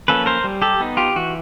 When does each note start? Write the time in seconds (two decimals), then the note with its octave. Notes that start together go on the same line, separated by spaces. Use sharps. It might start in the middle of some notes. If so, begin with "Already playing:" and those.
0.08 F3 A#3 C#4 A4 B4
0.26 A#4 C5
0.44 G3
0.62 G4 A4
0.80 B3 D#4
0.97 F4 G4
1.16 E3 F#4